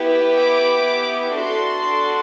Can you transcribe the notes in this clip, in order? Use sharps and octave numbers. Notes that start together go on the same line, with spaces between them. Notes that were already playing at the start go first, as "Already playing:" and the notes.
Already playing: B3 E4 G4
D6
D4 F#4 A4 C6